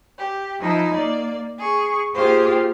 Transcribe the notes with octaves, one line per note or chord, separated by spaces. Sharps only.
G4
F3 D#4 E4
A#3 D5
G#4 C#6
A#3 F4 G4 G#4 C5 F5